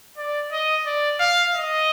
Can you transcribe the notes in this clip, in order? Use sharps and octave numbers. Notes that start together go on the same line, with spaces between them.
D5
D#5
D5
F5
D#5